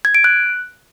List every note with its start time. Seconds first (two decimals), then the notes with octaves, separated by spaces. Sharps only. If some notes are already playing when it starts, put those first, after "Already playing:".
0.05 G#6
0.15 D7
0.24 F#6